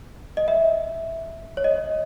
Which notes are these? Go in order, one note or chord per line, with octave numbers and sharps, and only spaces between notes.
D#5
E5
C#5
D#5